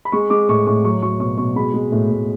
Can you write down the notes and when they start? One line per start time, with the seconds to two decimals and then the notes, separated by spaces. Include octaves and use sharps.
0.05 B5
0.12 G#3 C#6
0.30 G#3 D6
0.49 A2 C#6
0.67 A2 C#6
0.84 F#3 C#6
1.02 F#3 C#6
1.20 B2 C#6
1.38 B2 C#6
1.56 G#3 B5
1.74 G#3
1.92 A2
2.10 A2